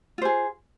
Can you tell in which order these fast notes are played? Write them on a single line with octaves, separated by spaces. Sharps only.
F4 C5 G#4